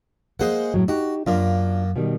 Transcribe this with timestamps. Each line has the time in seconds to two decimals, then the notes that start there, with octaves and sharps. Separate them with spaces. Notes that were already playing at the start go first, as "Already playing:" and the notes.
0.40 G#3 A#3 G#4 C5 F#5
0.74 A2 C3 F#3
0.88 D#4 F#4 G4
1.27 F#2 A#3 D4 F4
1.96 B2 D#3 G3